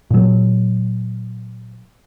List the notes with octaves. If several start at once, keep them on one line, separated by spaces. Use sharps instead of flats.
A#2 F#3